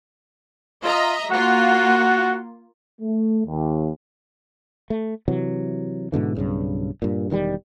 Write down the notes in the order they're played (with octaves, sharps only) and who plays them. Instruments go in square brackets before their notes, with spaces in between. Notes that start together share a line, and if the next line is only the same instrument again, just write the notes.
[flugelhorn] F4 [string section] D#5 E5 A#5
[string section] A#3 F4 [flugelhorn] F#4 [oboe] F#5
[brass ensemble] A3
D#2
[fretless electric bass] A3
C3 E3 F#3
G#2 B2 D3 E3
B1 G2 C#3
G2 A#2
E1 D#3 F3 G3